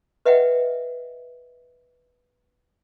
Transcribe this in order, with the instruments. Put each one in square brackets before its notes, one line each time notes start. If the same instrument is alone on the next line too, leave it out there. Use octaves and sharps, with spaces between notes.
[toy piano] B4 D#5 E5 F#5 G5